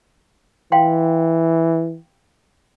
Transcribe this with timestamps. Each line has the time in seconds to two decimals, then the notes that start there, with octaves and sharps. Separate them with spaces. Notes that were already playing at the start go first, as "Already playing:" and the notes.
0.72 E3 F5 G5 C6